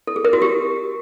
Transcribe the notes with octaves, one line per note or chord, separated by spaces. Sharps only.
A4
G#4
A#4
F#4
G4